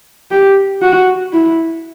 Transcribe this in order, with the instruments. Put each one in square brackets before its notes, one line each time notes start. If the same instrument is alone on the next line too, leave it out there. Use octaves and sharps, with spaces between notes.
[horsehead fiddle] G4
F#4
E4